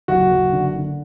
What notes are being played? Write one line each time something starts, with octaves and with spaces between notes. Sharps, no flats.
F#1 F#4
F#1
D3
D3